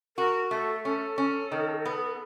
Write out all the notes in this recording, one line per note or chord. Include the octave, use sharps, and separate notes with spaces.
F#4 A#4
A3 A4
C#4 A4
C#4
D#3
B3